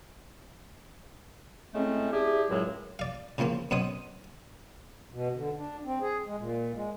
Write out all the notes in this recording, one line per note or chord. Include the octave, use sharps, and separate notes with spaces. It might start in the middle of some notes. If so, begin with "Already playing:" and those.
A2 G#3 A3 C4 C#4
D4 E4 G4 G#4
C#2 F#2 A2 F#3 G#3
D5 F5
C#3 E3 F3 A#3 C4
F#2 B2 C4 C#5 D#6
B2
D3
D4
C4
G#4
G#3
A#2
G#3